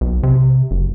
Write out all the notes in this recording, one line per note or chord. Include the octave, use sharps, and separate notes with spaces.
B1
C3
F#1